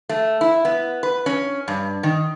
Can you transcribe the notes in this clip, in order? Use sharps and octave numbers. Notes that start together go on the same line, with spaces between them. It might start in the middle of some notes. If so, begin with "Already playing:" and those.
A3
E4
B3
B4
C#4
G2
D#3